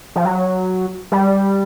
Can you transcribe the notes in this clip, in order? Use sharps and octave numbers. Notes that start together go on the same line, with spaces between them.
F3
F#3
G3